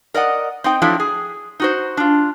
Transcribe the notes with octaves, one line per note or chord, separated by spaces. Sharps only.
A#4 D5 D#5 F#5
C4 D#4 G5
F3 F#3 A3 D4 E4
G#4
D#4 F#4 C5
D4 F4